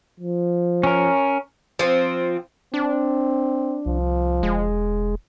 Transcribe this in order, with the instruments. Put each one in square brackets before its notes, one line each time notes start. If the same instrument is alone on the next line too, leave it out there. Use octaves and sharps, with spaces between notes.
[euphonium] F3
[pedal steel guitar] C#4 A#4
[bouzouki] F3 C4
[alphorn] C4 [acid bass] D4
[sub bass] C2 [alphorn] F3
[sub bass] E1 [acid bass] G#3